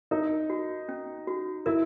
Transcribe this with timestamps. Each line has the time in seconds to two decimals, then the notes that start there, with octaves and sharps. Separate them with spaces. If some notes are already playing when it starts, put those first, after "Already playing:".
0.11 D#4 A#4
0.50 F#4
0.89 C#4
1.27 F#4
1.66 E4 A#4